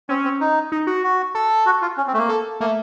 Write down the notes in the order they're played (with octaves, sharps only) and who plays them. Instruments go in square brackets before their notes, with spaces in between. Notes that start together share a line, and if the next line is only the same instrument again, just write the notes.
[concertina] C4 [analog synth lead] C#4
[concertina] C4
D#4
[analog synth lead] D#4
F#4
[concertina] F#4
[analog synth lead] A4
[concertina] F#4
F4
C#4
C4
A3
A#3
[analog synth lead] A4
[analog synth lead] A3 [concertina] A#3